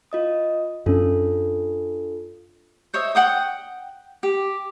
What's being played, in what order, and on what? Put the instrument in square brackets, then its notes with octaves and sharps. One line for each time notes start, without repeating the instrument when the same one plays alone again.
[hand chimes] F4 D#5 D#6
[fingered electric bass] F#2 C#4 [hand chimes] D4 F4 A4
[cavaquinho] C5 C#5 D#5 E5
F#5 G5 D#6
G4